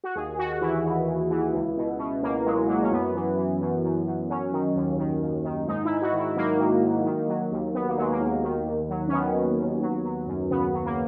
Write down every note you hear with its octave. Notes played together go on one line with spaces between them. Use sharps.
F#4
D#2 G#4
D#2 F#4
F#4
E3 E4
D#2
D#2
E3
C#2
B2
B2
C#2 A#3
F#3 G#3
F#3 A#3
C#4
F#2 B3
E3
E3
F#2
F#2
F#2
F#3 C#4
D#3
D#2
D#3
D#2
D#3
G#2 D#4
E4
G#2
E4
F#4
D#3
E4
F#3 A#3
D#3
G#2
D#3
F#3
D#2
D#2 B3
A#3
F#3 G#3
A#3
D#2
D#3
D#2
F#3
C#4
D#3 B3
D#3
D#2
F#3
F#3
F#2
C#3 B3
F#3
A#3